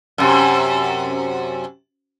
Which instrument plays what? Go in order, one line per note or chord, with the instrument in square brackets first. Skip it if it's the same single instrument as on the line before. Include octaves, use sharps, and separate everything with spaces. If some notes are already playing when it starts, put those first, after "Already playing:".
[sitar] F#2 C3